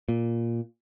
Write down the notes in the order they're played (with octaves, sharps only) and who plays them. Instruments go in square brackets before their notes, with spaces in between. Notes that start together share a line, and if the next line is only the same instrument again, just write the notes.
[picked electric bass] A#2